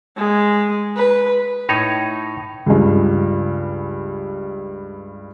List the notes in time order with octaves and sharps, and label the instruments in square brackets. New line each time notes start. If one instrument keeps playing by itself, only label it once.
[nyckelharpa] G#3
B4
[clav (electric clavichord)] A2 D#4 C#5
[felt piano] C#2 G2